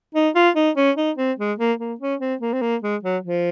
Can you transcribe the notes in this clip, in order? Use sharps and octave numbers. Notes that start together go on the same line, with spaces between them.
D#4
F4
D#4
C#4
D#4
C4
G#3
A#3
A#3
C#4
C4
A#3
C4
A#3
G#3
F#3
F3